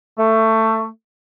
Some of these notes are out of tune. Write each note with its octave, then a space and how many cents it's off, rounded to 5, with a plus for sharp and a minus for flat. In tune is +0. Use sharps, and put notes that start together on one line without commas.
A3 +20